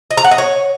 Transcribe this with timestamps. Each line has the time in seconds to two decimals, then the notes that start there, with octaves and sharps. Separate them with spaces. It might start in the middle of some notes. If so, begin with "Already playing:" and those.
0.11 D#5
0.17 A#5
0.24 F#5
0.31 D#5
0.38 C#5